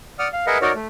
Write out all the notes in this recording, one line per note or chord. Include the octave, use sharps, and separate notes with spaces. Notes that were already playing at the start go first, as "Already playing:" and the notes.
D5 F#5 D#6 F6
F5
G#4 A#4 B4 D#5 E5 F#5
D#4 F#4 A#4 C#5 D5
A3